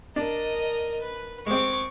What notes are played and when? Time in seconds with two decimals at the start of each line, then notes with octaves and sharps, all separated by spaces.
0.16 D4 A#4 D#5
1.02 B4
1.47 G#3 C4 C#6 D6